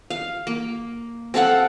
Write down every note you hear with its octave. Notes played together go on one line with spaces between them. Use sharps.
F5
A#3
C4 A4 F5 F#5